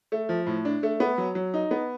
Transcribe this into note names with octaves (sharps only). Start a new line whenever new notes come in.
A3
F3
A2
D4
A3
B3
F#3
F#3
D#4
B3